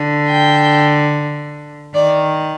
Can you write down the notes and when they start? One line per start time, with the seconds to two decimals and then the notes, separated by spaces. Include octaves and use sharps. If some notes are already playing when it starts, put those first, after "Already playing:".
Already playing: D3
0.29 G5
1.95 D#3 D5